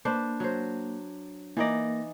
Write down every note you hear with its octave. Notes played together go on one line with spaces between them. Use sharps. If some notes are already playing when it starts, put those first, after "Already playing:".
A#3 D4 B4 C5
F#3 C5
E3 A#3 D#4 D5 A#6